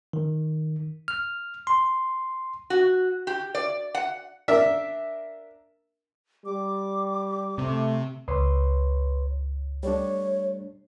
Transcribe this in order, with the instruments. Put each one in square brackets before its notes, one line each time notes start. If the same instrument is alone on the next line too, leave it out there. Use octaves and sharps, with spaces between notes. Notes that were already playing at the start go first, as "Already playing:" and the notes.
[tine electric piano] D#3
F6
C6
[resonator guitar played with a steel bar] F#4
G4
D5
F#5
[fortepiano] D4 A#4 E5
[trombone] G3 [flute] D6
[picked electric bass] C3 [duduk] A3
[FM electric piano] C#2 [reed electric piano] B4 C#5 C6
[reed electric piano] G3 A3 D4 [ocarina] C#5